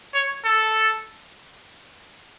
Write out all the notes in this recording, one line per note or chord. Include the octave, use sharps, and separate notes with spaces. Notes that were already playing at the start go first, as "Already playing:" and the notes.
C#5
A4